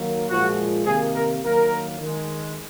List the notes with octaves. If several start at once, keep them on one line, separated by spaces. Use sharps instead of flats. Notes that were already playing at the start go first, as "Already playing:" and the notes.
Already playing: D#3 F#3 A#3
A#2 F3 G#3 F#4
C3 D#3 A#3 G#4
A#4
D#3 F#3 A#3 A#4
D#3 G#3